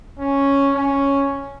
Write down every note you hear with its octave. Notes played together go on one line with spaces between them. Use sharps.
C#4
C#4